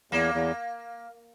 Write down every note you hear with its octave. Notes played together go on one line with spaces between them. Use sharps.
E2 A#3
E2